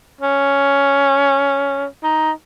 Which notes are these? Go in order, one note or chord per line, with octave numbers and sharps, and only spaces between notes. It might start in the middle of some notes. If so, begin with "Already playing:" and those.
C#4
D#4